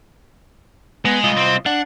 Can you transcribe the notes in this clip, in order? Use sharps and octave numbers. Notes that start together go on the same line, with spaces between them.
G#3 B3
C2 F4 D#5
C4
D4 F#5